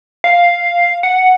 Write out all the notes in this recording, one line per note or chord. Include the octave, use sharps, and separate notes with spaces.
F5
F#5